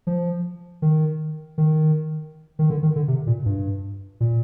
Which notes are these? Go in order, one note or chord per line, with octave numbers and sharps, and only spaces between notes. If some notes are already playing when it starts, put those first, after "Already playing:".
F3
D#3
D#3
D#3
D3
D#3
D3
C3
A#2
G2
A#2